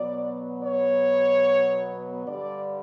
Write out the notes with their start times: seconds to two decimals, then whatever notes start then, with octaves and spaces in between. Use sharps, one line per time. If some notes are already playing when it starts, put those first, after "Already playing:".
Already playing: B2 F#3 B3 D5
0.61 C#5
2.25 G2 D3 G3 D5